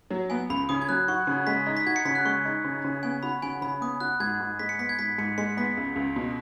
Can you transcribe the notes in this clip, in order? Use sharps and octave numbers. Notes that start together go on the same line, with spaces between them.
F#3
B3 G#5
C#2 B5
C#3 D#6
G#6
F#3 F#6
F#4 C#6
C#3
G#3 B6
D#4
B6
F#4 G#6
C#7
C#3 B6
F#6
G#3 C#6
D#4
C#3
C#3
B3 G#5
F#4 B5
C#3 G#5
C#3 B5
B3 D#6
F#4 F#6
G#2 G#6
G#2
G#3 B6
C#7
B3 B6
G#6
G#2 B6
G#2 C#7
G#3 C#7
B3 B6
C#2
C#2
B2